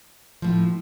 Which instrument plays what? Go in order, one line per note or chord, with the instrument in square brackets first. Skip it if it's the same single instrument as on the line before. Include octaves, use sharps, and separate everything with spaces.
[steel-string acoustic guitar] A2 F3